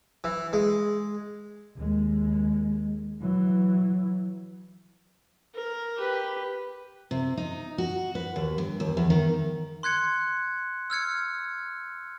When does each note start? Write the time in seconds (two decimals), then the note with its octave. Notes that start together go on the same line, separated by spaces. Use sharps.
0.24 E3
0.53 G#3
1.77 D#2 G#3
3.21 E3 F#3
5.54 A#4
5.97 G4 B4
7.11 C3
7.37 D#4
7.78 F#4
8.15 B4
8.36 D#2
8.58 G2
8.80 D#2
8.97 E2
9.10 D#3
9.83 C6 F#6 G#6 C#7
10.90 E6 F6 G#6 C#7